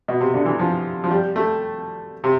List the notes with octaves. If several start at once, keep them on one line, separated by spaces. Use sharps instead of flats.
B2
C3
D3
E3
F3
F3
G3
A3
C3